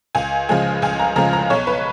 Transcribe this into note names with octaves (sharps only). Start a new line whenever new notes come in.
C#2 G#5
C#3 F3 G#3 G#5
C#2 G#5
A#5
C#3 F3 G#3 A#5
A#5
B1 C#5
B4